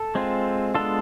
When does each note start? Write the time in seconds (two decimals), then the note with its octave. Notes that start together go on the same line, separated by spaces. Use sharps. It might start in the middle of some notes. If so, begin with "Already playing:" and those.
Already playing: A4
0.15 G#3 C4 F4
0.74 G#3 B3 D4 F4 A4